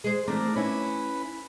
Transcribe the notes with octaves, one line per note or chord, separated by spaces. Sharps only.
G#3 G#4 C5
E3 A3 C4 D4 A#4
C#4 E4 B4